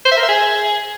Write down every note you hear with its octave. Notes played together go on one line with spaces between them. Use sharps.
C5
E5
A#4
E5
G#4